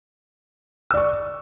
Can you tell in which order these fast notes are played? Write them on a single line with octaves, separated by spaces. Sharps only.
E6 D5 C#6